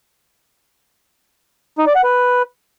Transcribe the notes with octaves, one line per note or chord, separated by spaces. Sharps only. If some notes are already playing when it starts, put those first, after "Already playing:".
D#4
D5
F#5
B4